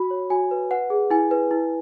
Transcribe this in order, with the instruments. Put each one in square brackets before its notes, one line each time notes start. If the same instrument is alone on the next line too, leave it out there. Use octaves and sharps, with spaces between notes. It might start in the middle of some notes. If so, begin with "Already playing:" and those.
Already playing: [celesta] F#4 B5
C#5
F#4 G#5
B4
B4 F#5
G#4
E4 G#5
B4
E4